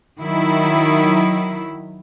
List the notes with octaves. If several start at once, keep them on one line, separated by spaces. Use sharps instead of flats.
D#3 F#3 E4